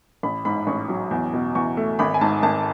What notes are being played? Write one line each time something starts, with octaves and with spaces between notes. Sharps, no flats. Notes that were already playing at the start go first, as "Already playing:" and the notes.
A1 B5
G#2 B5
A1 C#6
F#3
E2
B2
E2 C#6
A3
G#1 B5
G#5
G#2 A5
G#1 A5